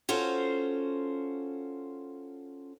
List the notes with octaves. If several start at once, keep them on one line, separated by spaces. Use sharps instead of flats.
C#4 F4 F#4 A4 C5